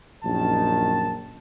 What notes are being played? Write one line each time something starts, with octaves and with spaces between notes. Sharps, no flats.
A#1 F#2 D#3 A5